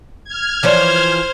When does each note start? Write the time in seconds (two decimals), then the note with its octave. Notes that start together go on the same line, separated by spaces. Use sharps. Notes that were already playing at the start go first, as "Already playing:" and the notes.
0.24 F6 G#6
0.63 E3 F3 C5 C#5